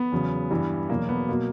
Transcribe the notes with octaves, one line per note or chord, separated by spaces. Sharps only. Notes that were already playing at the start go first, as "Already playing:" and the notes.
Already playing: B3
E2 C#3 F#3
G2 E3 G3
E2 B2 F#3 A#3
B3
B2 F#3 A#3